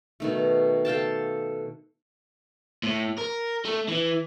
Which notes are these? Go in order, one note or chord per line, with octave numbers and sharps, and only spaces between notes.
B2 D#3 A3
A4 F5 G5 A5
A2
A#4
A3
E3